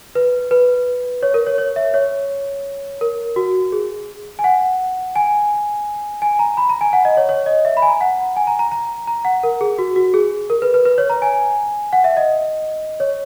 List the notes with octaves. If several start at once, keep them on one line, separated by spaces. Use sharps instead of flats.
B4
B4
C#5
A#4
C#5
C#5
E5
C#5
A#4
F#4
G#4
G#5
F#5
G#5
G#5
A#5
B5
A#5
G#5
F#5
D#5
C#5
C#5
D#5
E5
B5
G#5
A#5
F#5
G#5
A#5
A#5
A#5
A#5
F#5
A#4
G#4
F#4
F#4
G#4
A#4
B4
B4
B4
C#5
A#5
G#5
F#5
E5
D#5
C#5